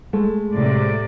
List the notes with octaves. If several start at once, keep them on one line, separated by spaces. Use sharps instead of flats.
G#3 A3
A2 C3 D5